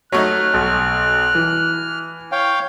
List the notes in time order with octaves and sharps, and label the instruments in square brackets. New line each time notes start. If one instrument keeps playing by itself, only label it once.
[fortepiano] F#3 A3 D#4 [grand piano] C#5 [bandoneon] F6 [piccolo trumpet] F#6
[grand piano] B1
E3
[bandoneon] C#5 F5 G5